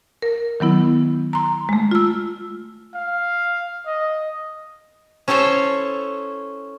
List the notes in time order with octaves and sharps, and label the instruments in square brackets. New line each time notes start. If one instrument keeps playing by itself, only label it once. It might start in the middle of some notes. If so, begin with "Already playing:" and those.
[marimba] A#4
D#3 F#3 B3 E4
A#5 C6
G#3 A3
F4 E6
[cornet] F5
D#5
[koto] C#4 E4 A4 C5 C#5